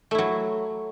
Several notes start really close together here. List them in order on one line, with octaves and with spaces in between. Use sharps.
A3 E4 F#3